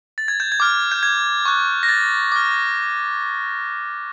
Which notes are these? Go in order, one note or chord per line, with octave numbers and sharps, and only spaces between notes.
A6
G#6
G6
G#6
D6 F6
G6
G#6
C#6 F#6
A#6
A6
D6 F6